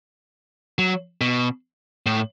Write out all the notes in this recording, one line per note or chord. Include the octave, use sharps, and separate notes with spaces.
F#3
B2
A2